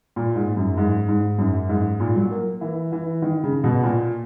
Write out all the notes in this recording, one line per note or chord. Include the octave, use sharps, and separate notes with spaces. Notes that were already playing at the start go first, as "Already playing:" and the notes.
A#2
G#2
F#2
G#2
G#2
F#2
G#2
A#2
F#3
A#3
E3
E3
D#3
C#3
B2
A#2